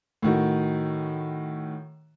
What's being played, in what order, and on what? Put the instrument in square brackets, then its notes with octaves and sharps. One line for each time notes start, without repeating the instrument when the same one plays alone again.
[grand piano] A2 D#3 F#4